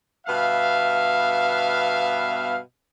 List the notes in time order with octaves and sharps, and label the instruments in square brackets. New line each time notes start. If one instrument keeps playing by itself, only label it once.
[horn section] G2 B2 B3 E5 F5